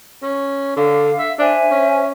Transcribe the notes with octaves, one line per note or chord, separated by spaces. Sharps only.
C#4
D3 F5
E5
D4 C5 E5 G#5
C#4